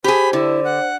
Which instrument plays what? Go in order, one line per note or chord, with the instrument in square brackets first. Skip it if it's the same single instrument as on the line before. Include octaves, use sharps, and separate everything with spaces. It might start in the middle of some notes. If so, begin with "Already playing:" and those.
[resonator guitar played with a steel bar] G4 G#4 [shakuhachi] C5 [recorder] B5
[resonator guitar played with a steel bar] D3 [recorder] E4
[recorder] F#5